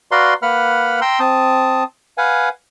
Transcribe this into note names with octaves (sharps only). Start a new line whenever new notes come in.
F#4 B4 D5 F5 A#5 C6
A#3 B4 F#5 B5 F6
G5 A#5 C6 E6
C4 A5 D#6
B4 F5 F#5 G#5